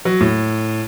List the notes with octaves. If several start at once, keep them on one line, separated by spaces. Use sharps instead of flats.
F#3
A2